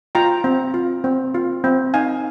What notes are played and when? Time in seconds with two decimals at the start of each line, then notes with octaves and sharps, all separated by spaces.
0.15 F4 G5 A#5
0.44 C4
0.74 F4
1.04 C4
1.34 F4
1.64 C4
1.94 D#4 F5 G#5